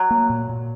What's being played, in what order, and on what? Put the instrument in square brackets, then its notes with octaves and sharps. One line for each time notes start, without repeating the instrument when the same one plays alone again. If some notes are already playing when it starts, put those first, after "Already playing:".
Already playing: [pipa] F#3
[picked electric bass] A#3
A#2
A#2